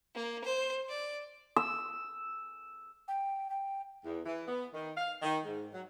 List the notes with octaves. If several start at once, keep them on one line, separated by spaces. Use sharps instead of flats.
A#3
C5
D5
E6
G5
G5
E2
E3
B3
D#3
F5
D#3
G#2
F#3